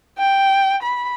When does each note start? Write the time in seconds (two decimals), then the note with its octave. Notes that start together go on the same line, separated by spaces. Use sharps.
0.18 G5
0.83 B5